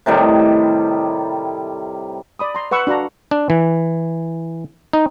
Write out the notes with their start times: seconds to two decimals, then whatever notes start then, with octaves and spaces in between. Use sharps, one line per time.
0.06 A2 C3 D#3 G3
2.39 D5 B5 D#6
2.55 A#5 C6
2.71 B4 F#5 C#6 E6
2.87 D4 F#4 F5 A#5
3.31 D4
3.50 E3
4.93 D#4